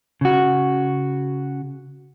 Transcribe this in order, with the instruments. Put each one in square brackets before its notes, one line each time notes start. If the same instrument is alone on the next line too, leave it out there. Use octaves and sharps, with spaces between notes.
[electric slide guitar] C#3 F#4